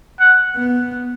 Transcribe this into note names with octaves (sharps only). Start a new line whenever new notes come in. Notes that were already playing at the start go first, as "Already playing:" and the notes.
F#5
B3